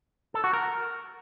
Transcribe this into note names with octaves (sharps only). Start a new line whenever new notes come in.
A4
F#4
A#4